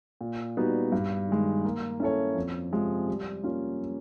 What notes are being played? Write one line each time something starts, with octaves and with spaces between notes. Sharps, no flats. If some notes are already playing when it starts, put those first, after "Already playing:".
A#2
G3 B3 D#4 F#4
G2
D#3 G#3
A#3
C#4 E4 A4 C#5
F2
C3 F3 G#3
G3
A#3 C#4 F4